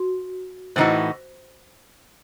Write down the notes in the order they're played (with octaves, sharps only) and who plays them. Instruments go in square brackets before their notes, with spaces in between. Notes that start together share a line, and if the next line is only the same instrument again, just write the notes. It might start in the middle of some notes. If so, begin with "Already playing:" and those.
Already playing: [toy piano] F#4
[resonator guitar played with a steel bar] A2 E3 C4 D#4 F#4 [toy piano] C5